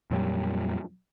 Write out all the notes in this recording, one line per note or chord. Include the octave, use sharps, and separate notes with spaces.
F2 A#2 F#3 G3